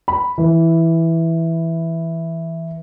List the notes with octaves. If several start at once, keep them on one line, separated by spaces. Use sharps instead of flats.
B5
E3